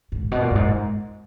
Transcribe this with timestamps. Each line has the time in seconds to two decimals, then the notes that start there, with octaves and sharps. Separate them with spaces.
0.12 G#2
0.32 B2
0.41 A#2
0.51 F#2
0.55 G#2